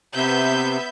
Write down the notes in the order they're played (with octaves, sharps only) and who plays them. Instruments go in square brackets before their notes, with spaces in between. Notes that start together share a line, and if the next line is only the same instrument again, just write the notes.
[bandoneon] C3 [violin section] B3 E5 G6